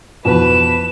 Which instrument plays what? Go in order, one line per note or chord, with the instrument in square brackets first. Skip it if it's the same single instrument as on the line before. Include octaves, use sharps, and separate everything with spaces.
[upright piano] F2 B2 E3 [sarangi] B4 [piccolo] E7